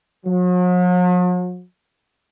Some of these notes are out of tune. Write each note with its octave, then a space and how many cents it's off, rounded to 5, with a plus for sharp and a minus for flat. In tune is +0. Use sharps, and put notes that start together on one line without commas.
F#3 -45